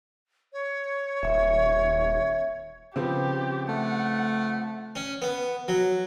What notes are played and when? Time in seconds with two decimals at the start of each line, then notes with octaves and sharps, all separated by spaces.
0.53 C#5
1.23 D#1 E5
2.96 C#3 F3 B3 C4 G4
3.69 A3 F#5
4.96 C#4
5.22 B3
5.68 F#3